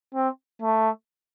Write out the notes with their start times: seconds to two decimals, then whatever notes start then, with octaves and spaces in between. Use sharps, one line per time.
0.14 C4
0.62 A3